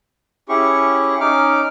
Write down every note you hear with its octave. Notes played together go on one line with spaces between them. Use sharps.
C#4 E4 G4 G#4 C#6
C#4 D#4 D6 F6